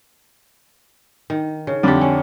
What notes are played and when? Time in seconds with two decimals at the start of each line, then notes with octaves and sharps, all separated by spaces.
1.30 D#3
1.67 C#3
1.83 F2 D3 G4 D5
2.01 C#4